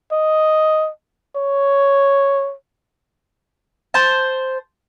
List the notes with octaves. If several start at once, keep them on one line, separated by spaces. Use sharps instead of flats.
D#5
C#5
C5 A5